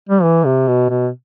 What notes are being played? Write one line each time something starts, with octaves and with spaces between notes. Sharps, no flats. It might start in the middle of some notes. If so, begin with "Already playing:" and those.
G3
E3
C3
B2
B2